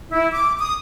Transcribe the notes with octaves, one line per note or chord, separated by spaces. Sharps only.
E4
D6
D#6